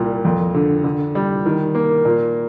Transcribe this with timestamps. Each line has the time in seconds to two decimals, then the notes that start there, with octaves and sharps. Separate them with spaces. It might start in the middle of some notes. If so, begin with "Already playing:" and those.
Already playing: C2 A#2 G3
0.25 F2
0.55 D3
0.84 D3
1.15 G3
1.46 D#3
1.75 A#3
2.05 A#2